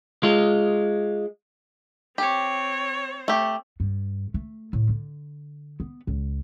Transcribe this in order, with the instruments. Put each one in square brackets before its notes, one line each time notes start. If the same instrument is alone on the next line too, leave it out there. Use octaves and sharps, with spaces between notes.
[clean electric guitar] G#3 F4
[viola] C4 C#5 [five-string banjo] G4
[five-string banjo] A3 G4
[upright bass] G2
A3
A2
D3
B3
C#2